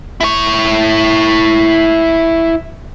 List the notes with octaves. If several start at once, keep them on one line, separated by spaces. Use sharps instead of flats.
E4 C#5